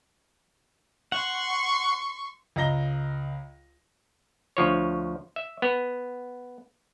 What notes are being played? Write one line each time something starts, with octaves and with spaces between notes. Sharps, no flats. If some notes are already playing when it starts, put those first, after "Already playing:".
F#5 C6 C#6
C#2 D#5 A#5 A#6 G7
D2 F3 C#5
E5
B3